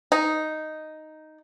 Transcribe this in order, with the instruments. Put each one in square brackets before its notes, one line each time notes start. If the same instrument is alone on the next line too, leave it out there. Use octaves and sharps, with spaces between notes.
[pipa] D#4